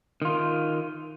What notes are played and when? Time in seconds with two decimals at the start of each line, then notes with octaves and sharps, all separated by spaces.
0.22 D#3 F4